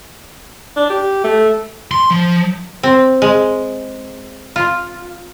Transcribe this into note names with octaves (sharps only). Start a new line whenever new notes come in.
D4
G4
A3
C6
F3
C4
G#3
F4